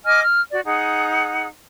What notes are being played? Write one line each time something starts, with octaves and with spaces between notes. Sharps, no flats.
D#5 G#5 D6 F6
F6
F#4 D5
D#4 G#4 F#5